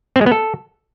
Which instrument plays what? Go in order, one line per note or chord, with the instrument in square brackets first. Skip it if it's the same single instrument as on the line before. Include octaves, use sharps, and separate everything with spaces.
[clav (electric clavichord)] C4
G#3
B3
A4